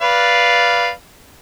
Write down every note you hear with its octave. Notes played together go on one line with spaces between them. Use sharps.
B4 D5 F5